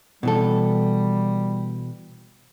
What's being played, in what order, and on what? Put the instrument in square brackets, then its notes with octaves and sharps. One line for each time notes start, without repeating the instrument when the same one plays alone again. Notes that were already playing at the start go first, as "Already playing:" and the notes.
[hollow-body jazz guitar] B2 E3 A4 [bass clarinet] G3